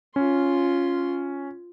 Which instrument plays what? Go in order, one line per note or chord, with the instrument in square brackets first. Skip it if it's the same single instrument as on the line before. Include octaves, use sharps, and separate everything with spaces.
[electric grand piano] C#4 [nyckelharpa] F4 C6